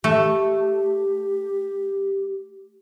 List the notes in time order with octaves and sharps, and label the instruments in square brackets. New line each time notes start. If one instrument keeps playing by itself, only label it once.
[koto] A3 [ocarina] G4